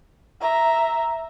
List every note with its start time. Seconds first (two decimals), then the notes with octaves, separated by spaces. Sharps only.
0.41 E5 A#5